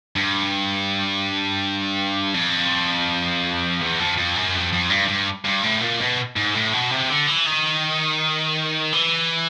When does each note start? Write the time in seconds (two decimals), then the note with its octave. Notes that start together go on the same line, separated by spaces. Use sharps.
0.16 G2
2.34 F2
3.81 E2
3.99 F2
4.17 F2
4.36 F#2
4.54 F2
4.72 F2
4.90 G2
5.08 G2
5.45 G2
5.63 A2
5.81 A#2
6.00 B2
6.36 G#2
6.54 A2
6.74 B2
6.91 C3
7.10 D3
7.27 E3
7.46 D#3
8.93 E3